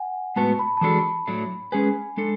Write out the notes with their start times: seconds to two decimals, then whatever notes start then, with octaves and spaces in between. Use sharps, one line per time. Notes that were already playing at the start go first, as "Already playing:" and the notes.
Already playing: F#5 G#5
0.36 A2 G#3 B3 F#4 B4 A5
0.59 B5
0.77 A5
0.81 E3 G#3 D4 F#4 A4 B5
1.27 A2 F#3 A3 D4
1.72 G#3 C#4 G#4 B4 G#5
2.17 G#3 D4 A4